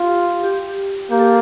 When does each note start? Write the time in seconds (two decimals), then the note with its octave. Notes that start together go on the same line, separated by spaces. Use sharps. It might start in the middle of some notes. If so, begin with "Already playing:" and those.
Already playing: F4 G4
0.43 G4
1.11 A#3 G4
1.19 A4